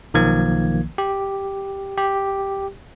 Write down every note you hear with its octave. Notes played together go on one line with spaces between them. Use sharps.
B1 D#3 F3 A#3 G#6
G4
G4